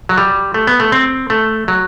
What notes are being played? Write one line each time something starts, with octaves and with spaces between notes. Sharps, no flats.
F#3
G3
A3
B3
A3
C4
A3
F#3